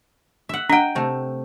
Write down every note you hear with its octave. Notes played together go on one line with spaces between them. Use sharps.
E5 F#5
D4 D#5 F#5 G5
C3 A3